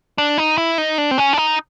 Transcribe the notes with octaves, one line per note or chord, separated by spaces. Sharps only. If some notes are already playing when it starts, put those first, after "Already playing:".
D4
D#4
E4
D#4
D4
C4
C#4
D4
D#4